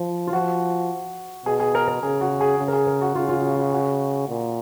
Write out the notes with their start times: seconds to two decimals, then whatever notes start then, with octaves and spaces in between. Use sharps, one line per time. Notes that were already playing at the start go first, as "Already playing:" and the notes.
Already playing: F3
0.27 F4
0.33 F3 F#4
1.46 B2 G#4
1.60 G#4
1.75 A#4
1.88 A#4
2.03 C#3 G#4
2.21 F#4
2.41 G#4
2.59 C#3
2.68 A#4
2.73 G#4
2.87 A#4
3.01 F#4
3.15 C#3 F4
3.29 F4
3.44 F#4
3.57 F#4
3.72 F#4
4.28 A#2